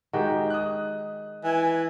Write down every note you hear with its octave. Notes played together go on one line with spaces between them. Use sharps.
D#3 G#3 F#4 G4 G5
D#6 F#6
E3 G#5